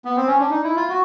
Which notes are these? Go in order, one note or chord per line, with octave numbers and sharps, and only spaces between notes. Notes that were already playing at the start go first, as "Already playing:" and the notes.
B3
C4
C#4
D4
D#4
E4
F4
F#4